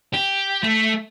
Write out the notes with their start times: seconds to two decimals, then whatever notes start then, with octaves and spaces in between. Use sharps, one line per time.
0.13 G4
0.63 A3